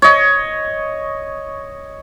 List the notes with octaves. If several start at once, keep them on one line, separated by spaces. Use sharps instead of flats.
C#5 D#5